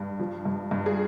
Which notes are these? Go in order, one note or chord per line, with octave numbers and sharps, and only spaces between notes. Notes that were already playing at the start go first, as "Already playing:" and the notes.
Already playing: G2
F3
G2
G2
G#4